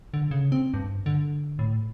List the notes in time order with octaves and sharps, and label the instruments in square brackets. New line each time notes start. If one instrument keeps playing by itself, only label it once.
[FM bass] D3
C#3
C4
G2
D3
A2